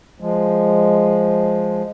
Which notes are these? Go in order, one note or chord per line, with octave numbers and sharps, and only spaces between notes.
F3 G#3